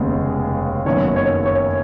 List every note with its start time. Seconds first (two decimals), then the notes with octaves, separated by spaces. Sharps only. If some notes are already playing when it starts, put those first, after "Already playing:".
Already playing: F1 D#2 C#3 G#3 B3
0.85 F#1 F#2 D#3 F#3 B3 C#5
1.08 D#5
1.16 C#5
1.45 C#5